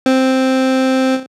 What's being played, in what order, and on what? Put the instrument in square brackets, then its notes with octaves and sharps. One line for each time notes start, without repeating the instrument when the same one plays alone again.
[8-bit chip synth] C4